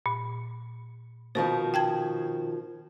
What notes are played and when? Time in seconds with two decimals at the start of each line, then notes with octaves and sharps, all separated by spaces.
0.06 A#2
1.35 B2 D#3 F3 C5
1.74 G5 A5 G#6